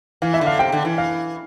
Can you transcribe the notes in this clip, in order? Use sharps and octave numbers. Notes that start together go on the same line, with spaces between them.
E3 F5
E5
D3
F5
C3 G5
D3
E3
F5